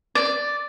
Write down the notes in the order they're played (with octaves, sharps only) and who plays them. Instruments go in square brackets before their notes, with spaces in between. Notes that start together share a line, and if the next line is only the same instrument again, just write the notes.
[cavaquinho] D5